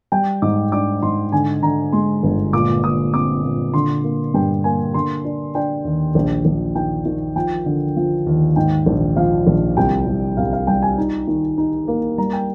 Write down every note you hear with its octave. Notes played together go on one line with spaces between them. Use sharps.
G3 G5
G#2 D6
D4 D6
G#2 C6
D3 G#5
D3 A#5
G#3 C6
G1
A#2 D6
A#2 D#6
C4 D6
A#2
D3 C6
A#3
G2 G5
A#3 G#5
D3 C6
D4
D4 G5
D#2
A#1
A#1
D#3 G5
D#3
F3 G5
D3
F3
D#2
G#2 G5
A#1
F3 F5
A#1
C2 G5
C2
C2 F5
F5
G3 G5
G#5
D#4
D#3
D#4
A#3
G3 A#5
G5